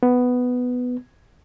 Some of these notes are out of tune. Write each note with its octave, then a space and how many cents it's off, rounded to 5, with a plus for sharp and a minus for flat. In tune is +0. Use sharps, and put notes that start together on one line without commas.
B3 +5